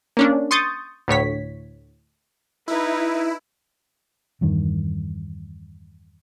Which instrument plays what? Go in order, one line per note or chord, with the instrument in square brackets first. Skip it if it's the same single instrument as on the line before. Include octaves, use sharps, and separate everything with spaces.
[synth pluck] A#3 C#4 D4
C6 C#6 D#6 G6 A6
D2 A2 C#5 B6
[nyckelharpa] D#4 B4 [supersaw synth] E4
[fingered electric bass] E2 G2 D#3